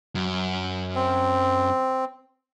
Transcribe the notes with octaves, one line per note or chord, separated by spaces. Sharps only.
F#2
C4